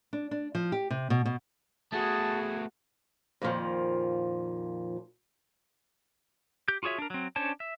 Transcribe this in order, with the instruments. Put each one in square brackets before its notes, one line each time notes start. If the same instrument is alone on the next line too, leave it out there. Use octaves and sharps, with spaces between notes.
[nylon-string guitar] D4
D4
F3
G4
C3
B2
B2
[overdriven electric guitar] A3 B3 [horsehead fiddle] F#4 [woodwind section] G#4 [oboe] A5
[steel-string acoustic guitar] F2 A#2 D#3 F3
[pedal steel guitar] G4 G6
F4 F#4 G#4 C#5 E5
D4 A#4
F#3 C4
C#4 D4 C5 C#5 A5
E5